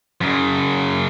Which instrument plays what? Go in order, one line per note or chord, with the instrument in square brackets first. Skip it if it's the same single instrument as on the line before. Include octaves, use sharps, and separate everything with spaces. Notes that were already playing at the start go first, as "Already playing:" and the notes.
[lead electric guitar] F#2 C#3